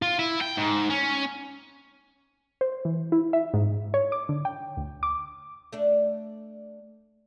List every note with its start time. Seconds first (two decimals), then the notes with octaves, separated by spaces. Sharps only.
0.02 F4
0.19 E4
0.41 G5
0.57 G#2
0.90 C#4
2.61 C5
2.85 E3
3.12 E4
3.33 E5
3.54 G#2
3.94 C#5
4.12 D6
4.29 D3
4.45 G5
4.77 D2
5.03 D6
5.73 A3 D4